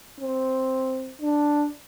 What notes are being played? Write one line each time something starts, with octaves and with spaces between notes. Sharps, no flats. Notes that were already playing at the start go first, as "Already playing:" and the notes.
C4
D4